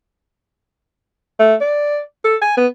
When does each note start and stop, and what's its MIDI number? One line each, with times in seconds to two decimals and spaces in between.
1.39 1.55 57
1.61 2.00 74
2.25 2.36 69
2.42 2.56 80
2.57 2.67 59